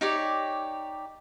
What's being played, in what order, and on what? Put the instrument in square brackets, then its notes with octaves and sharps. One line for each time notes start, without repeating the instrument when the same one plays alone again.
[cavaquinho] D#4 G4 C#5 D5